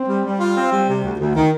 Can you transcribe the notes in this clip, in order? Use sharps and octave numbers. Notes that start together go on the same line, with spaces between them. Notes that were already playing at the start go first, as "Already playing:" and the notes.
Already playing: C4
G3
G3
F4
C4
G3
C3
D2
D2
D#3